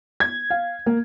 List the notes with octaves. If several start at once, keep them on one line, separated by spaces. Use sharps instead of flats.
G#6
F5
A#3